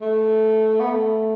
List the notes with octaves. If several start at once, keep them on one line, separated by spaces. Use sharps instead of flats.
A3
B3
A3